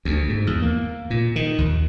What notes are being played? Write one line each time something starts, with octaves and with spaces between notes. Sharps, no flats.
D2
G#2
E2
A#3
A#2
D#3
D#2